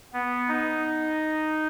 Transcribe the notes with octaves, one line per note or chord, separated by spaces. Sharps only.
B3
D#4